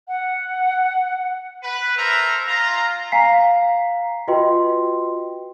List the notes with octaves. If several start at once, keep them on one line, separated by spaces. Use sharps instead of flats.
F#5
B4
A4 A#4 C5 E5 A#5
F4 A#5
F5 G#5 A#5 B6 C7
F4 F#4 B4 D#5 G5 C6